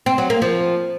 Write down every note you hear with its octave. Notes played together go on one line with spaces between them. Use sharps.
C4
F#3
A#3
F3